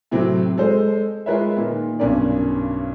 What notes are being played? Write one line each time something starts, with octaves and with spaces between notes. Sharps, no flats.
A2 C3 F#3 C4
G#3 A4 C5
G#3 F4 A#4 B4 C#5 E5
A#2 D#3
B1 G2 C#4 A#4 D5